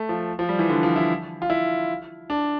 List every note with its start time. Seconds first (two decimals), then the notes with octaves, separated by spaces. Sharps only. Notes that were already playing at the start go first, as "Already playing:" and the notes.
Already playing: A3
0.09 F3
0.39 F3
0.49 G3
0.59 E3
0.69 D3
0.83 F3
0.96 E4
1.42 F4
1.50 E4
2.30 D4